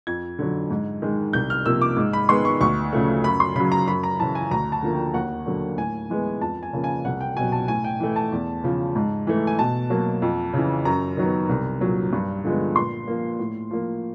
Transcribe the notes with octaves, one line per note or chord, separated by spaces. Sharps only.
F2 G#6
D3 F#3
G#2
D#3 G#3
C2 G6
F6
C3 F3 A#3 E6
D6
G#2
B5
D#3 G#3 B3 C6
C#6
D2 C#6
C#3 F3 A3
F#2 B5
C6
C#3 F#3 B5
A#5
F#2 B5
A#5
C#3 E3 A5
G#5
D2 A#5
A5
D3 F3 A#3
G5
D#2 F#5
D3 F#3 A#3
A2 G#5
E3 G#3 B3
F2 A5
G#5
C#3 F3 A#3
G#5
C2 F#5
G5
B2 F#3 G#5
A5
A2 G#5
G5
E3 A3
A5
E2
C#3 F3
G#2
E3 A3
G#5
B2 A5
F#3 A#3
F2
C#3 E3
F#2 A#5
D#3 F#3 B3
C2
A#2 F#3
G2
D3 F3 G#3 B3
A#2 C6
F3 A#3
A2
F3 A#3